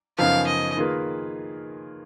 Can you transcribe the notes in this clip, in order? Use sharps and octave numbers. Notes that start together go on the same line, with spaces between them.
F#2 C#3 F3 B3 D#4 F5
D#5
D#3 A#3 F4 G#4 B4